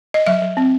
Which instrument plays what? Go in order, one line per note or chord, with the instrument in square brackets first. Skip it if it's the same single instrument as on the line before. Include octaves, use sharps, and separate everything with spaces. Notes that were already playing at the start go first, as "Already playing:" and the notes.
[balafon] D#5
F#3 E5
F#3
C4